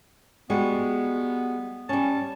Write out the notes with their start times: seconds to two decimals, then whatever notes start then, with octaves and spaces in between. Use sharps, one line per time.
0.50 G3 G#3 B3 F#4
1.89 G3 C#4 A5